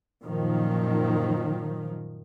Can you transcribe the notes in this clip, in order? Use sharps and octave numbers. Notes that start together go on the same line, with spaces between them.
F#2 A#2 D#3 F3